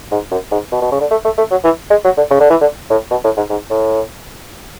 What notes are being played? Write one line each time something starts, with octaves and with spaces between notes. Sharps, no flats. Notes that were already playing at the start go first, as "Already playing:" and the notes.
G#2
F#2
G#2
B2
B2
C#3
D3
A3
A3
A3
F#3
E3
G#3
F#3
D3
C#3
D3
E3
D3
A2
B2
A2
G#2
G#2
A2